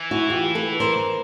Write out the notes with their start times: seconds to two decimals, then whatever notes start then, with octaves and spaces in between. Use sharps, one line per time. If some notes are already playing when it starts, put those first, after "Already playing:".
Already playing: E3
0.11 E4 F#4
0.30 F4 G4
0.55 A4 B4
0.80 A#4 C5